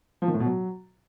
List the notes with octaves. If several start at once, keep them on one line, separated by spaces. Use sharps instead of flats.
F3
D#3
A2
B2
F#3